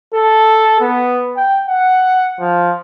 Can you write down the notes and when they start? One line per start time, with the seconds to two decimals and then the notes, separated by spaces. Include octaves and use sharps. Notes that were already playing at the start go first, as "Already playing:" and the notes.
0.14 A4
0.81 B3
1.36 G5
1.68 F#5
2.40 F3